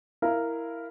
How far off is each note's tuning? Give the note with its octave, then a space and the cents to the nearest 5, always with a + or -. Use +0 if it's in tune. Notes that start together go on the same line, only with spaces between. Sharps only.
E4 +0 A#4 -5 F5 -20